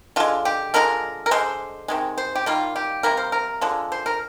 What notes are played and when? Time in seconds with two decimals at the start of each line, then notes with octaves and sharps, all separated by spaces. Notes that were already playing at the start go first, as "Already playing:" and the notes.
0.16 D3 G#3 F4
0.45 G4
0.74 D3 F3 G#3 A#4
1.26 A#4
1.31 D3 G#3 C5
1.88 C3 D#3 G#3
2.18 C5
2.35 G4
2.46 D#3 G3 A#3 F4
2.76 G4
3.03 C3 G3 A#3 A#4
3.17 C5
3.32 A#4
3.61 D3 F3 G#3
3.92 C5
4.06 A#4